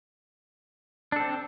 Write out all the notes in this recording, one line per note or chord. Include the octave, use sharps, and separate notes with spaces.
C4 D4 A4